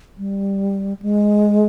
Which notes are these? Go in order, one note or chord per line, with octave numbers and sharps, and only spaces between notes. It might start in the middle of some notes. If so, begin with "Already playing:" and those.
G3
G#3